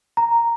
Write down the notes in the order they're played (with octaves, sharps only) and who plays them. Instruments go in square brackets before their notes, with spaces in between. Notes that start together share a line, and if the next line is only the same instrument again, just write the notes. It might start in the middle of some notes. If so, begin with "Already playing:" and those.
[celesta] A#5